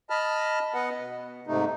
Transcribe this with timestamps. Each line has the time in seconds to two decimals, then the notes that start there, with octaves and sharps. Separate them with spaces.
0.10 D#5 A5 B5 F6
0.74 B3 B4 D#5 F#5
0.97 B2
1.47 G#2 C3 A3 D#4